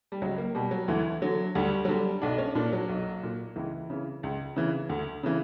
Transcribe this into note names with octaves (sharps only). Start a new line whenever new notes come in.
G3
C#2 F#3
A#3
B2 G3
F#3
D2 E3
D3 F#3
D2 G3
F#3
D3 G3
B1 D4
C#4
A#2 D4
F#3
B1
A#2
C#2 E3
C#3 E3
C#2
C#3 E3
D2
C#3 E3